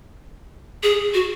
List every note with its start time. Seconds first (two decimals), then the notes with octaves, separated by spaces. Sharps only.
0.83 G#4
1.14 F#4